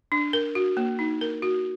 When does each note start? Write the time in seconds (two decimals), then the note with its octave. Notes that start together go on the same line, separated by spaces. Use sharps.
0.12 D4
0.33 A#4
0.55 F#4
0.77 A#3
0.99 D#4
1.21 A#4
1.42 F#4